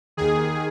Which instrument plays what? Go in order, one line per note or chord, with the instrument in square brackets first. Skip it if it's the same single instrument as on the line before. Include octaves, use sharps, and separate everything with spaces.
[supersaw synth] D#2 D#3 G#4